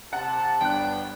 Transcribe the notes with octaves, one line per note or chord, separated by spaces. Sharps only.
C3 F#5 A5
G1 B3 D4 G5 F#6